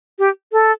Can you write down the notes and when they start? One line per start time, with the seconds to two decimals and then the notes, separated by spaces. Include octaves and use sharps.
0.19 G4
0.52 A4